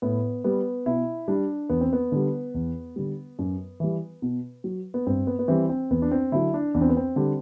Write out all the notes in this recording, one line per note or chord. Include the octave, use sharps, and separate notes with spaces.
A2 B3
G3 B3
B2 E4
G3 D4
E2 B3
C4
B3
D3 G3
E2
D3 G3
F#2
E3 G3
B2
F#3
B3
G2 C4
B3
B3
E3 G3 C4
C4
E2 B3
D4
C4
D3 F#3 E4
D4
E2 D4
C4
B3
C4
D3 G3